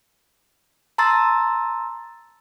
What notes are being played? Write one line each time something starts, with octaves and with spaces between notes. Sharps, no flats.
A5 A#5 C6 E6 A6